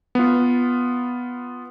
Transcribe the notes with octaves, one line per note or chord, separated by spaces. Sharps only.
B3 F4